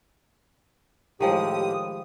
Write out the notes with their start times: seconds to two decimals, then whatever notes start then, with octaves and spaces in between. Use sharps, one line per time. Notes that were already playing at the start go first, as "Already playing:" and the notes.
1.20 A2 D#3 F3 G#3 G4 D#6